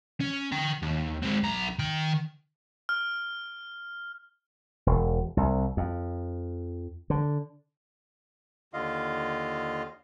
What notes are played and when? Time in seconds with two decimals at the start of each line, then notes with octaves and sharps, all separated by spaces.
0.21 C#4
0.52 A#4 G5
0.82 D#2
1.22 G#3 C4
1.43 B1 A#5
1.79 D#3 G5
2.89 F6
4.86 E1
5.37 C2
5.77 F2
7.10 D3
8.73 D#2 D3 F4 D#5 F5